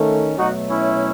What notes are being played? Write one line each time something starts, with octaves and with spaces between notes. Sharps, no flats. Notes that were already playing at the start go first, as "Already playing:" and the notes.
Already playing: D#3 A3 C#4
B2 F#3 A3 D#4 F#4
C#4 E4